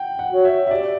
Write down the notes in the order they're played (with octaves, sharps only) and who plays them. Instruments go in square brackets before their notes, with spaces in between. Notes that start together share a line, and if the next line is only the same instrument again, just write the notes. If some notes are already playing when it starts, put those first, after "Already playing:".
Already playing: [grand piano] F#5 G5
F#5
[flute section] F#4 C#5
[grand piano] E5
E5
[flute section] G4 [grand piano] D5